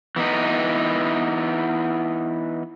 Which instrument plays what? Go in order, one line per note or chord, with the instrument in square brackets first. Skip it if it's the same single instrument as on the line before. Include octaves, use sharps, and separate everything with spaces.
[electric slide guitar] E3 B3 D#4